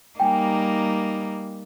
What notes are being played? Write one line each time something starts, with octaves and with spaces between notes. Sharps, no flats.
G3 A#3 D#4 G5 G#5